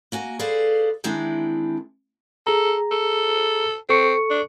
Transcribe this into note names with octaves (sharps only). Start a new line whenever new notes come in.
A#3 F#4 G#5
G#4 A4 B4 C5 D5 F5
D#3 E3 G#3 C4 D4 E4
G#4 A4 A#5
A4
C4 A4 C#6 C#7
D4